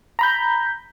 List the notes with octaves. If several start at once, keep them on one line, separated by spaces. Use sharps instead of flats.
A#5 B5 G6